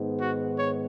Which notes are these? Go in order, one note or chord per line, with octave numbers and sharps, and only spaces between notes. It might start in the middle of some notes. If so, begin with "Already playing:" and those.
Already playing: G#2 D#3 G#3 B3
F#4
C#5